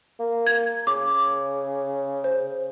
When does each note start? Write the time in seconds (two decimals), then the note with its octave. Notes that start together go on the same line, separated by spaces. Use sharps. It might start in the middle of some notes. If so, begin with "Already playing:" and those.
0.19 A#3
0.47 G#6
0.87 C#3 D6
2.24 C5